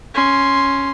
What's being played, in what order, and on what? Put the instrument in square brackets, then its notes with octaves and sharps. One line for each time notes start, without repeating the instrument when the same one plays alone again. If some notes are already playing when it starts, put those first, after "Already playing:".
[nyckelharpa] C#4 C6